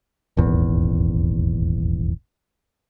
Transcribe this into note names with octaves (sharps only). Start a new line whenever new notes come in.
D#1 G#1 E2